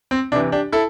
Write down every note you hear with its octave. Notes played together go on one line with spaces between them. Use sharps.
C4
C3 E3 D4
D4 G4
E4 A4